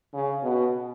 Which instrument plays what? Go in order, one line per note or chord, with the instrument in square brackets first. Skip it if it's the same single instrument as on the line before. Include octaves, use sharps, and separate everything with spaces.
[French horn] C#3
B2